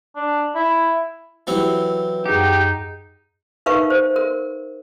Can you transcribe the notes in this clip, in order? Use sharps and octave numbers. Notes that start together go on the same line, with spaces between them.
D4
E4
E3 F#3 C4 E4 G4 B4
F#2 D#4 G4 G#4 F#5
D#4 A#4 B4 E5 F5 C#6
C5
A#4